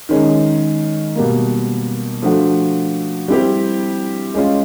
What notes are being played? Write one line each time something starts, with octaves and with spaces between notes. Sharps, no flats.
D#3 G#3 C#4
B2 G3 A#3
F3 A3 D4 F#4
G3 C4 E4 G4
G#3 C#4 F4